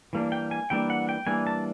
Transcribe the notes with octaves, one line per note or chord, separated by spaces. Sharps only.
E3 G3 A#3 D4
G5
G#5
E3 G3 A#3 D4 G5
F#5
G5
E3 G3 A#3 D4 G#5
A5